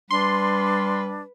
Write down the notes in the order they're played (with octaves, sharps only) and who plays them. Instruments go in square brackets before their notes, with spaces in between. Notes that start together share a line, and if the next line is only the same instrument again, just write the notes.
[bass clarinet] G3 [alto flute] D4 [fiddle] B4 [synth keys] C6